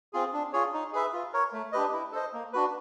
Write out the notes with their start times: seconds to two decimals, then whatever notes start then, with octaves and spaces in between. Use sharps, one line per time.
0.13 C4 F4 G#4
0.33 D4
0.53 F4 G#4 C#5
0.74 D#4
0.93 G#4 B4 E5
1.13 F4
1.33 A#4 C#5
1.53 A3
1.72 D4 G4 B4 D#5
1.93 E4
2.12 A4 C5 D#5
2.33 A#3
2.53 D4 F#4 B4